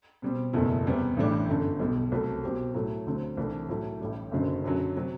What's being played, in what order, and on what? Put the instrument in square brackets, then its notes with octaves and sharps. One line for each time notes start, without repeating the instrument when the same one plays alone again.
[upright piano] B2 G3 C4
F#1 E2 B2 A3 E4
E2 C3 G3 B3
A1 A2 E3 G3 D4
G1 F#2 D3
B1 B2 G3
C2 C3 F#3 A3
C2 B2 F#3 C4 G4
A2 F#3 A3 E4
D2 D3 F#3 C4
C2 C3 E3 A3 D4
A2 F#3 A3 E4
A1 A2 G3
F#1 F#2 D3 F#3 C4
F#2 D3 F#3
C3 F#3